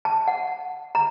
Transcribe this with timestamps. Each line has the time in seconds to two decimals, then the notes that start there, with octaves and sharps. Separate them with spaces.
0.05 A5
0.27 F#5
0.95 A#5